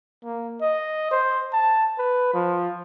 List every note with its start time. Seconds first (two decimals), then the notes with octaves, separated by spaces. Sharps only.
0.24 A#3
0.61 D#5
1.11 C5
1.53 A5
1.98 B4
2.33 F3